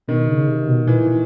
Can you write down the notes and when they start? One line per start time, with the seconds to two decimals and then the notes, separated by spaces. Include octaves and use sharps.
0.08 B2 D#3
0.28 C#3
0.48 C3
0.67 B2
0.87 A#2 E3